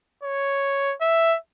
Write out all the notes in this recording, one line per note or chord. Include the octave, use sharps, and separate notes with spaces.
C#5
E5